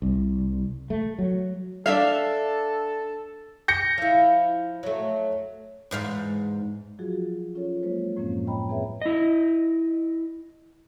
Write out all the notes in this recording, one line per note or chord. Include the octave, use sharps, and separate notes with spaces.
C2
A3
F#3
D4 A4 E5 F5
G6 A#6 C#7
F3 E4
F#3 A3
E2 G#2 F5
F3 F#3 F4 F#4 G#4
C#4 F4 A4 C#5
F#3 G#3 A#3 F4 C5 C#5
F#2 A2 F3 A#3 C4 C#4
C#5 D#5 G5 A#5 B5
E2 C4 G#4 B4 C#5 E5
E4 D#5